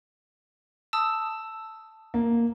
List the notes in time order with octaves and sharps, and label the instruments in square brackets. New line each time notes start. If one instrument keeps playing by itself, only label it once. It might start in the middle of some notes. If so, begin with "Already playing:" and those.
[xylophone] A5 D#6 E6
[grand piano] A#3